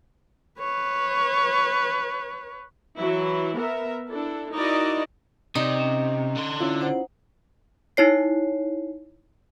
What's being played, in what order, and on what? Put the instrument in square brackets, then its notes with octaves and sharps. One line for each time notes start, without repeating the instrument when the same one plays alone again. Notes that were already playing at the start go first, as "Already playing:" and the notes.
[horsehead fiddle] B4 C#5
[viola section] E3 F#3 E4
B3 A#4 E5
D4 E4 A4
D#4 E4 F#4 A#4 D5 D#5
[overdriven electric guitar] C3 [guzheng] D#4 [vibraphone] D5
[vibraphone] C#4
[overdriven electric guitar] D3 C6
[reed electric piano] C#4 E4 F4 [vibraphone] E6
[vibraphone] C5 F#5
[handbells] D#4 E4 C#5 C7